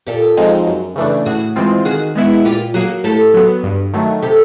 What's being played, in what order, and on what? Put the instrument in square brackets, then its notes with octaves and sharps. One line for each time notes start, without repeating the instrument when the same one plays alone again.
[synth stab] A#2 [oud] G4 A4
[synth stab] F3 G#3 C4 D#4
F#2
C#3 E3 A3 D4
[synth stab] A2 [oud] F#4 G#4
[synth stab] E3 G#3 C4 F4
[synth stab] D#3 [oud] F#4 G#4
[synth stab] G#3 B3 E4
[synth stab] A#2 [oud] F4 G4
[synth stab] F#3 A#3 [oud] F#4 G#4
[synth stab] A2 [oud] G4 A4
[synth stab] F#3 B3
G2
D#3 F#3 A3
[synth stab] C3 [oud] G4 A4